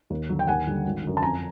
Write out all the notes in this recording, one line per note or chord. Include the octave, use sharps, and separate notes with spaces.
D#2
D3 F#3
G5
D#2 F#5 G#5
D3 G3
G#1
F#2 D3
A5
F2 G#5 A#5